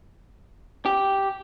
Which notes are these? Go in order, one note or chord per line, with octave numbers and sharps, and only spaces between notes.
G4